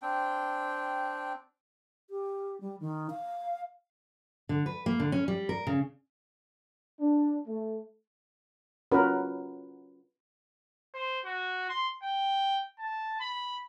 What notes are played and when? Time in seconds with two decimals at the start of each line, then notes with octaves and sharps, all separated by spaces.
0.02 C4 D4 G5
2.10 G4
2.61 G3
2.80 D#3
3.10 F5
4.49 D3
4.66 B4
4.86 A#3
5.00 D3
5.12 C#4
5.28 G3
5.49 A#4
5.67 C#3
7.00 D4
7.47 A3
8.92 C#4 F4 F#4 A#4 B4
10.94 C5
11.25 F#4
11.69 C6
12.03 G5
12.79 A5
13.20 B5